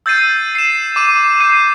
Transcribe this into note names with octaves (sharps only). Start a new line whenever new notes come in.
E6 G6 A6 C7 D#7
C7 E7
D6 D#7 E7
G6 C7 D#7